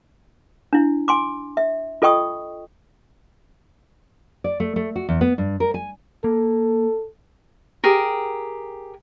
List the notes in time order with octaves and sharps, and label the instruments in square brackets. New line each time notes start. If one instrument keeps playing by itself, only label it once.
[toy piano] D4 E4
G#5 C6 D6
E5
F4 A4 D#5 G5 C#6 D#6
[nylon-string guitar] D5
A3
A3
F#4
E2
B3
G2
A#4
G#5
[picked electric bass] A#3 [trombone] A4
[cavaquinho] G4 G#4 A#4